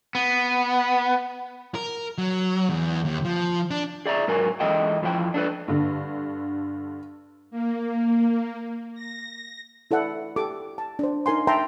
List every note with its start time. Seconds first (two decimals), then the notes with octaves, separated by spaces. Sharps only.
0.15 B3
1.75 A#4
2.18 F#3
2.69 E2
3.05 D#2
3.25 F3
3.71 D4
4.06 G#4 D5 E5 A#5
4.28 G#2 F#3 A#4 B4 G#5
4.60 E3 G#3 A4 D#5 G5 A5
5.02 F2 E3 F3 E4 G5
5.34 D4 A4 B4
5.68 G2 D3
7.51 A#3
8.94 A#6
9.91 E4 A4 D5 F#5
10.36 G4 A4 D6
10.78 A5
10.99 D4 C5
11.26 D#4 A#4 G#5 C6
11.47 A#4 E5 G5 A5 A#5 C6